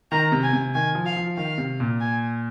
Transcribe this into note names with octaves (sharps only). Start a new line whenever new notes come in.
D#3 A#5
C3
G#5
C3
D#3 G#5
F3
F5
F3
D#3 F5
C3
A#2
G#5